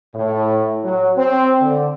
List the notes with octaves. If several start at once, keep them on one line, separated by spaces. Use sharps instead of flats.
A2
F#3
C4
D3